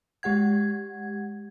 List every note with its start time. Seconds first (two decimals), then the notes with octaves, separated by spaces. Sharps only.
0.23 G#3 G4 F#5 G#6